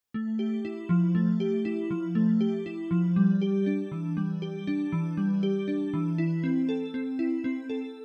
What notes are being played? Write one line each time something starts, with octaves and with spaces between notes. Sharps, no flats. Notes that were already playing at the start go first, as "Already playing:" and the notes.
A3
G4
E4
F3
A3
G4
E4
F3
A3
G4
E4
F3
G3
G4
D4
E3
G3
G4
D4
E3
G3
G4
D4
E3
E4
C4
A4
C4
E4
C4
A4